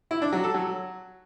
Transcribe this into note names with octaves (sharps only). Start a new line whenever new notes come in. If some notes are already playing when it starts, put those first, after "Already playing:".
E4
D4
F#3
A4
F#3